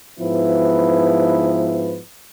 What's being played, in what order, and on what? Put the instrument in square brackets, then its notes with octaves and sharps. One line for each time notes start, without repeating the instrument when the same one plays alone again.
[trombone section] G#2 F3 B3 E4 B4